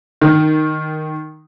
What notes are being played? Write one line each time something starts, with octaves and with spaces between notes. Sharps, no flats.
D#3